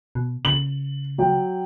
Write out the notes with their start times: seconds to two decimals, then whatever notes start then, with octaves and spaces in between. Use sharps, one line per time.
0.15 B2
0.45 C#3 F#7
1.18 F#3 G5